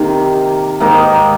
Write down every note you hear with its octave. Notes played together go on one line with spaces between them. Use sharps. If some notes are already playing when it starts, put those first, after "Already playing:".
Already playing: C3 D#3 A#3
G#2 D#3 A#3 D#4